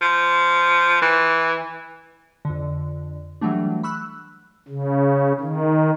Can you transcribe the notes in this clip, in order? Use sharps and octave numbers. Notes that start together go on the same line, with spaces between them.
F3
E3
F2 D3
E3 F#3 G3 A3 D4
B5 C#6 E6 F#6
C#3
D#3